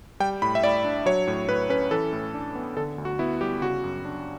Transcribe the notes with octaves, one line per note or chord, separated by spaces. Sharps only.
G3 G5
A2 B5
E5
A2 D5
D4
F#3 C#5
A2
A2 B4
C#4 B4
E3 A4
A2
D4
B3
D3 A4
D2
F#4
B3 E4
G3 G4
C#3 F#4
F#2
D4